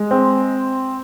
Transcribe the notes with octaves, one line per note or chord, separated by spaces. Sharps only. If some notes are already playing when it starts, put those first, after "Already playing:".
Already playing: G#3
C4